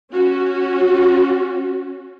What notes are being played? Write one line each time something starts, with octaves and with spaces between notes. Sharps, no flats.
C#4 F#4